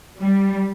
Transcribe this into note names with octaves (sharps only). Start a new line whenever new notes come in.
G3